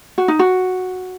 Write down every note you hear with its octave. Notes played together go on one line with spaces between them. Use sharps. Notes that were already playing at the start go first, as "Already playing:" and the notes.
F#4
D#4
F#4